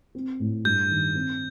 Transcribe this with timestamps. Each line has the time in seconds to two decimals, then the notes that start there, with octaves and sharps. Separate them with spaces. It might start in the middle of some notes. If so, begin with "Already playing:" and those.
0.15 C4
0.40 A2
0.65 G2 G6
0.90 D#3
1.15 C4